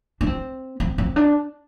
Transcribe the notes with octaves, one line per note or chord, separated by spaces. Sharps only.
D4
C4
C4
C4
D4